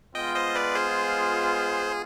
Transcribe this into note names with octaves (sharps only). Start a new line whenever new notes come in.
G#3 B3 F4 D#5 G5
C5 D#5
B4 D5
G#4 C5